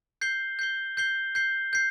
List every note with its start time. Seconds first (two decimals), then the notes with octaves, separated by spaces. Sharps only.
0.21 G6 C7 G7
0.59 G6 C7 G7
0.97 G6 C7 G7
1.35 G6 C7 G7
1.73 G6 C7